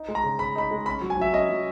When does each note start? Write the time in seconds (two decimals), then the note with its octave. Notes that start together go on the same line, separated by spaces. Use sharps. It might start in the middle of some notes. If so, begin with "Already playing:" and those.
Already playing: D#4
0.08 G#3
0.15 A#5
0.23 C#3
0.39 C#3 B5
0.55 D#4 B5
0.71 G#3
0.86 C#4 B5
1.01 F#3
1.10 G#5
1.17 F#3 E5
1.33 C#4 D#5
1.49 F#3